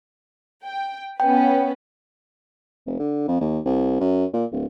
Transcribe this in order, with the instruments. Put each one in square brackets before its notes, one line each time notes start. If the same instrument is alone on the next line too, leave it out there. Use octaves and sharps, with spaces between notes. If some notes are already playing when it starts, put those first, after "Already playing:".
[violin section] G5
[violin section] B3 C#4 B4 [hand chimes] G5
[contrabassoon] F1
D3
F2
D#2
C2
F#2
A#2
D1